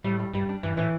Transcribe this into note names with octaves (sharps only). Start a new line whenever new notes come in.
A2 G3
G3
G2 G3
D4
G2 E3
A2 E3